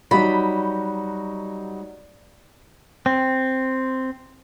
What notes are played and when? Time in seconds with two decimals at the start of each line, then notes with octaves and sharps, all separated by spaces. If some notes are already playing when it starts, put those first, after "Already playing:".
0.11 F#3 G3 D#4 F#4 B5
3.06 C4